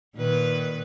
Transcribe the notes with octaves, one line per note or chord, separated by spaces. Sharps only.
A#2 D#3 B4